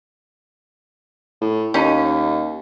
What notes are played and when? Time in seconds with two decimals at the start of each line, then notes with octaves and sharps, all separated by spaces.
1.41 A2
1.74 D#2 C#4 D#4